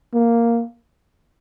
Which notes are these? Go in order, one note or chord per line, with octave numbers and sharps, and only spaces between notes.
A#3